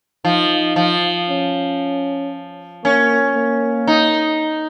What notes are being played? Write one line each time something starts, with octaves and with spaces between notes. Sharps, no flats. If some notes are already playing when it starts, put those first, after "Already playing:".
F3 D#4
F3
C#4
A#3 C#4
A#3
D#4